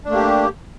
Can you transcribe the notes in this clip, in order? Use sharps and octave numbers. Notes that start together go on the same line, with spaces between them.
A3 A#3 D4 G4